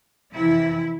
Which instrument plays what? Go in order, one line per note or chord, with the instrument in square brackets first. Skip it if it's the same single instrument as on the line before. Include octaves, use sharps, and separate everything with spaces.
[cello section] F2 C3 E3 E4